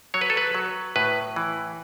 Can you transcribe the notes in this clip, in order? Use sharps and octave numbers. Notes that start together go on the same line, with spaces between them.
F#3 C#5
B4
A4
B4
F#3
A2 B4
E3